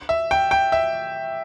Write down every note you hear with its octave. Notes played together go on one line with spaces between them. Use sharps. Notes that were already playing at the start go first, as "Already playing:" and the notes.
E5
G5
G5
E5